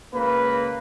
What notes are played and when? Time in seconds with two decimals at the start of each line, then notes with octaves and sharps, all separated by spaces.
0.14 C#2 A#3 B4